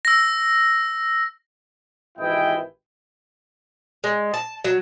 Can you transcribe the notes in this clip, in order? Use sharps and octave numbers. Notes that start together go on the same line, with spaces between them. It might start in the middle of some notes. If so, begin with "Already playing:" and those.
E6 A#6
G#1 C3 E3 E4 D#5 G5
G#3
A5
F#3